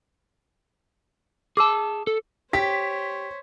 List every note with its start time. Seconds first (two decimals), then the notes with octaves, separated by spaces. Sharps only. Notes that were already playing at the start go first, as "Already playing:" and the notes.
1.57 G#4 A5 D6 E6
2.07 A4
2.53 G4 C5 C#5 B6